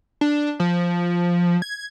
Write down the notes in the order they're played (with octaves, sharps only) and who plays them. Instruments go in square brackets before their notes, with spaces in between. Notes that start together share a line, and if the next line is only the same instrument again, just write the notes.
[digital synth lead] D4
F3
G#6